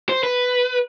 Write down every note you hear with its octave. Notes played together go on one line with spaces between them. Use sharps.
C5
B4